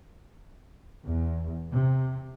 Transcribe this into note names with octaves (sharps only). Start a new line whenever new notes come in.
E2
C3